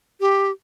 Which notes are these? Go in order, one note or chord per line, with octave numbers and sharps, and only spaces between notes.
G4